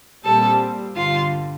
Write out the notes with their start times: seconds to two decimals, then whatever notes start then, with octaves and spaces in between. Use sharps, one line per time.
0.25 A#2 G3 C4 A4
0.95 G1 G2 D3 G3 F4